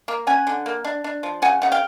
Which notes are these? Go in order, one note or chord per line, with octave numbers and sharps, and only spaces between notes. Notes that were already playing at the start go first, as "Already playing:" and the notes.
A#3
C#4 F#5 G#5
D3
A#3
D4
D4
F3
C#3 F#5 G#5
C#3 F#5
F5 G5